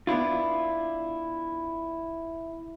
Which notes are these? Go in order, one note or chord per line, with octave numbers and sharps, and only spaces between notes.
B3 D4 E4 F4